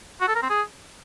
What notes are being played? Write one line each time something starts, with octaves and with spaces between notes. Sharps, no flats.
F#4
A4
A#4
C4
G#4